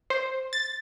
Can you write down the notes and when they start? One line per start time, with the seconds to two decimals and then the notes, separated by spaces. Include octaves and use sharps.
0.10 C5
0.53 A6